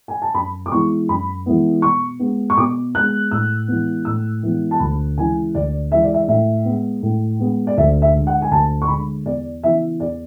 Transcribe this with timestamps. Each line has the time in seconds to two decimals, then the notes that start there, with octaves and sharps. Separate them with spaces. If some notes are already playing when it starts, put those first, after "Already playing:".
0.08 G#5
0.22 A5
0.34 F#2 B5
0.66 D6
0.72 E3 G#3 B3 C#6
1.09 F#2 B5
1.46 E3 G#3 B3
1.82 B2 C#6
2.20 G#3 B3
2.50 C#6
2.57 B2 D6
2.94 G#3 B3 F#6
3.31 A2 E6
3.68 E3 G#3 B3
4.05 A2 E6
4.43 E3 G#3 B3
4.71 A5
4.80 D2 B5
5.17 C#3 E3 G#3 G#5
5.55 D2 D5
5.91 C#3 E3 G#3 E5
6.03 D5
6.14 E5
6.28 A2 E5
6.65 G#3 B3
7.02 A2
7.39 G#3 B3
7.67 D5
7.77 D2 E5
8.02 E5
8.15 D3 G#3
8.27 F#5
8.42 G#5
8.51 D2 A5
8.82 C#6
8.88 D3 G#3 B5
9.25 E2 D5
9.63 C#3 E3 B3 E5
10.00 E2 D5